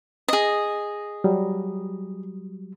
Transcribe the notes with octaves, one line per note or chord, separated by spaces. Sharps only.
G#4 D#5
F#3 G3